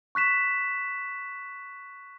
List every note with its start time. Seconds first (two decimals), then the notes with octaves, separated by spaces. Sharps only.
0.15 C#6 F#6 B6 E7